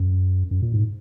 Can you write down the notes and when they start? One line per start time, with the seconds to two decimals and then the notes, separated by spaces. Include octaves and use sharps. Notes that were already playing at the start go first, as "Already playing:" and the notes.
Already playing: F#2
0.51 F#2
0.62 A#2
0.74 G#2